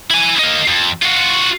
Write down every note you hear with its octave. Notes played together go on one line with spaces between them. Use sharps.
E4 G#5
A#3 D#4
F2
F4 F#4